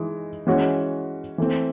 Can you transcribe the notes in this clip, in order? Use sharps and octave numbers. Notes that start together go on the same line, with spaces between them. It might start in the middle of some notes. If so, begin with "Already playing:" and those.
Already playing: E3 G#3 D#4
E3 G#3 C#4 F#4
E3 A3 C4